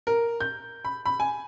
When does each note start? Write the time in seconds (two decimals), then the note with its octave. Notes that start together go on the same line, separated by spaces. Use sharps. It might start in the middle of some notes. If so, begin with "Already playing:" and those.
0.07 A#4
0.40 G6
0.85 B5
1.06 B5
1.20 G#5